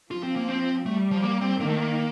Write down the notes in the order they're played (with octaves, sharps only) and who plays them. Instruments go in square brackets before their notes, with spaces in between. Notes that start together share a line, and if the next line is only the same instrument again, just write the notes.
[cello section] F3 [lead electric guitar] F4
[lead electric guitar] C4
A#3
C4
[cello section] G3 [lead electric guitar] A3
[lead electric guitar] F3
A#3
C4
[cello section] D#3 [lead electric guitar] A#3
[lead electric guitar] A3
A#3